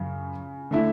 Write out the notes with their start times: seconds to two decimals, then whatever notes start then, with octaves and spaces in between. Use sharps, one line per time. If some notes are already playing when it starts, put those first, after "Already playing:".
Already playing: F#2 C#3
0.71 D3 A3 E4